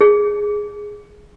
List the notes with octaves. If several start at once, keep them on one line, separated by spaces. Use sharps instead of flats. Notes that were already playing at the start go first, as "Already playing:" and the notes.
G#4